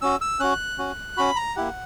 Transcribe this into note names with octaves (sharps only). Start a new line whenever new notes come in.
C#4 F#4 E6
E6
C#4 F#4 F#6
C#4 F#4
C#4 F#4 B5
A#5
A#3 E4 G4 F#5